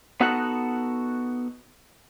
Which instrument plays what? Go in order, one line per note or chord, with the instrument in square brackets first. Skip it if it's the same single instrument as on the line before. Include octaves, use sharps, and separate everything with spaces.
[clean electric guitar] B3 D#4 F#4 A4 F#5